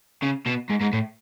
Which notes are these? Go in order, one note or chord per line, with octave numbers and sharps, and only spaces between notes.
C#3
B2
G#2
G#2
A2